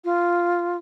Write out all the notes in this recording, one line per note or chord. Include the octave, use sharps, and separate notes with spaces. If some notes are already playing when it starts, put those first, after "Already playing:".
F4